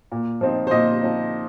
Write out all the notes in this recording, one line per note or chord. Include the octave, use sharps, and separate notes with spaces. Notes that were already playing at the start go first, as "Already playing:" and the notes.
A#2
F3 C4 D#4
C5
A#2 D#5
F3 C4 D#4